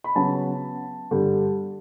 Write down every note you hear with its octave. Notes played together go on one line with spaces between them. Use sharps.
B5
C#3 F#3 B3 A5
G2 D3 G3